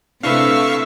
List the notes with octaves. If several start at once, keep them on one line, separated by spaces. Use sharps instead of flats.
C3 A3 D4 E4 B4 E5 F5 C#6